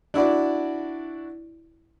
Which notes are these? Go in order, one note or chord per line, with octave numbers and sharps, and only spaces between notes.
D4 E4 F#4 D5